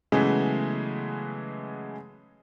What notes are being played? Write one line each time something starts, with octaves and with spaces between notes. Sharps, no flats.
C#3 E3 F#3 G#3 A3 B3